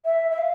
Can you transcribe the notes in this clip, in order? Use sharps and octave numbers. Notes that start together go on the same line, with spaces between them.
E5
E5
F5